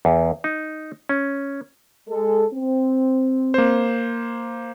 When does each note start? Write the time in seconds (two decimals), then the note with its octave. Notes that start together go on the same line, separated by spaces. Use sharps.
0.05 E2
0.44 D#4
1.09 C#4
2.10 G#3 A4
2.53 C4
3.54 A#3 C5